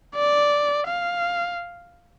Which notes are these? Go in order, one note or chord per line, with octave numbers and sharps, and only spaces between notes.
D5
F5